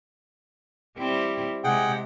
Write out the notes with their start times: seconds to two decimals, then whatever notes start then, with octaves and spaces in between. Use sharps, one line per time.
0.98 G3 C4 E4
1.64 C3 G#3 G#4 F#5 G5